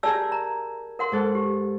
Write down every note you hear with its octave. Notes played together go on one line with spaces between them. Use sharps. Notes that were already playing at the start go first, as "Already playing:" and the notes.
G4 G#4 A#4 D5 A5 E6
A#5
A#4 F#5 C6
G#2 A4 F#6
G4